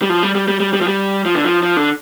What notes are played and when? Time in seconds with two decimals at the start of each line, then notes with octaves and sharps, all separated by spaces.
0.02 G3
0.09 F3
0.23 G3
0.35 G3
0.48 G3
0.60 G3
0.73 G3
0.81 F3
0.88 G3
1.26 F3
1.35 D3
1.44 F3
1.63 F3
1.77 D3